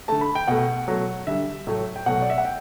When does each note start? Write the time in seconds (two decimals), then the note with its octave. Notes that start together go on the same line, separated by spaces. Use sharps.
0.08 D3 A3 A5
0.21 B5
0.35 G5
0.48 B2 A3 F#5
0.88 B2 F#3 A3
1.27 D3 G3 E5
1.67 A2 F#3 A3
1.96 G5
2.06 B2 F#3 A3 F#5
2.22 D5
2.30 E5
2.38 F#5
2.45 G5